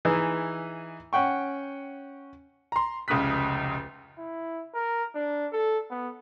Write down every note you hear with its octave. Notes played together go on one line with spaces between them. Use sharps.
E3 D#4 E4 G#4
C#4 F#5 G5 C#6
A#5 C6
F1 C#2 C#3 D#6 F#6 B6
E4
A#4
D4
A4
B3